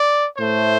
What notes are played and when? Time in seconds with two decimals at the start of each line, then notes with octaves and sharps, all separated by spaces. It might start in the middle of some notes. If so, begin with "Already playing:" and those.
Already playing: D5
0.37 A2 A3 C5